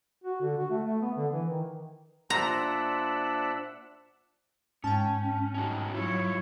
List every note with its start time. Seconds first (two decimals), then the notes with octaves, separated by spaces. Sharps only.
0.24 F#4
0.41 D3
0.58 F#4
0.70 A3
0.85 A3
1.01 B3
1.17 D3
1.33 E3
1.49 D#3
2.30 A#2 D4 C5 E5 F#5 A#5 C6
4.84 G#2 C#4 G5 A5
5.55 C#4 D#4 F#4
5.94 F#3 E4 F4 C#5